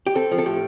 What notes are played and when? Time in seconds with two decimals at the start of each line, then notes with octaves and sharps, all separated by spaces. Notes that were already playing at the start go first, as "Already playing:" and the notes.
0.07 G4
0.15 C4 A4
0.31 F3
0.38 A4
0.45 A2 G4